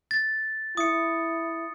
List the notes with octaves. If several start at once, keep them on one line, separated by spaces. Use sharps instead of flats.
A6
E4 D#6 C#7